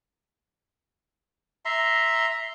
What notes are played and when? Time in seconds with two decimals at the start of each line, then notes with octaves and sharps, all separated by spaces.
1.65 E5 A#5 C6